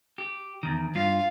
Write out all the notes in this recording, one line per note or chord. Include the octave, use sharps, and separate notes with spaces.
G4
E2 D#3
G2 F4 F5